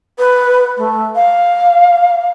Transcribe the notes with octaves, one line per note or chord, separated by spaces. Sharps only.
B4
A3
F5